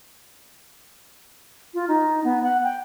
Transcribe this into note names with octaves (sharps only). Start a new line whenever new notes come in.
F4
D#4
B3
F#5
G5